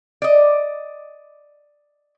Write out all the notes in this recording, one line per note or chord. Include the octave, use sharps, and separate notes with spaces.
D5 D#5